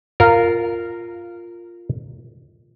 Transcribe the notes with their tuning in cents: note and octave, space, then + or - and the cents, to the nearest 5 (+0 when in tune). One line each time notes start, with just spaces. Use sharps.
F4 +0 A#4 -10